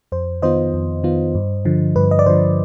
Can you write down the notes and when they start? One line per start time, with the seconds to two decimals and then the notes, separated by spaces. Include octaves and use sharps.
0.12 F2 C5
0.42 D#3 B3 F4 C5 D#5
0.74 F2
1.04 D#3 B3 F4
1.35 G2
1.65 D3 F3
1.96 G2 B4
2.11 D#5
2.19 D5
2.26 D3 F3 C5